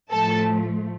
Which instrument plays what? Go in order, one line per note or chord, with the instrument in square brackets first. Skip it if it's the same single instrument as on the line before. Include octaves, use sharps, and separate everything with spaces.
[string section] A2 F3 A3 A4 A5